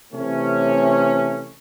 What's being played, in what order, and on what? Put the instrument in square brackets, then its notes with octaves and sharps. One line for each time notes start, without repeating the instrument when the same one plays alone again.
[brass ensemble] C3 E3 A3 C#4